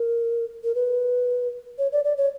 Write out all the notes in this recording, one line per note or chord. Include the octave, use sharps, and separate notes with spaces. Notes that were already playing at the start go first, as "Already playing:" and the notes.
Already playing: A#4
A#4
B4
C#5
D5
D5
C#5